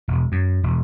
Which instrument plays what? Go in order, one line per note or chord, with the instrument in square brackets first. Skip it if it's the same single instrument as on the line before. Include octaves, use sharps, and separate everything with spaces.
[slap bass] E1
F#2
E1